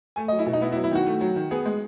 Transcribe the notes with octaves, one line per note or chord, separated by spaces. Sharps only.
A3 G#5
F#3 D#5
E4
B2
D#4
B3 E4
E4
F#3
E4
D#3 F#4
A3
F#3
D#3
B3 G#4
G#3